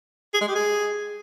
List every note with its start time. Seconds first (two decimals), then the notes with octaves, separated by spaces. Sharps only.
0.34 G#4
0.41 G#3
0.48 G4
0.55 G#4